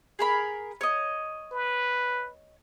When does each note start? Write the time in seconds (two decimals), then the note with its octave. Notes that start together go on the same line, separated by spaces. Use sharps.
0.19 G#4 A#4 B5
0.81 C#5 D#5
1.52 B4